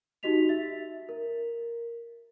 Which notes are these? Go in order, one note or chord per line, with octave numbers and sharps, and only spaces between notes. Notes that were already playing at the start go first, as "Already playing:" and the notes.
D#4 F#4 G4 D#5 B6 F7
E5 A6
A#4